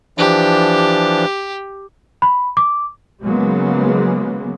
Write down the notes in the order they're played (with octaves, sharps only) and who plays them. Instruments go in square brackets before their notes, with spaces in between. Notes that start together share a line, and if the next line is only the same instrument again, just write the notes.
[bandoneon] E3 F3 D4 [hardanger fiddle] G4
[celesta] B5
D6
[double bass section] C#3 F#3 G#3 A#3 B3